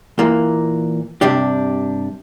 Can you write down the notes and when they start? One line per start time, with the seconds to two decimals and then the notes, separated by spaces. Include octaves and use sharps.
0.19 A#2 E3 A#3
1.21 G2 C3 D4 G4